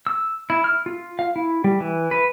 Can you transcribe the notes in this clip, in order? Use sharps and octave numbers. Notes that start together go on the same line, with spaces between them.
E6
E4
F6
F4
F5
E4
G3
E3
B4